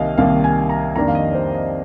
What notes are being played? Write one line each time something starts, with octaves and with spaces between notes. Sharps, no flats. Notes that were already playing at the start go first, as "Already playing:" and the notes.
Already playing: C2 C3 D#3 A#3 D#5 F5
C2 C3 D#3 A#3 F5
G#5
A#5
F2 D#3 A#3 D4 A#5
F5
D#5
D5
C5
D#5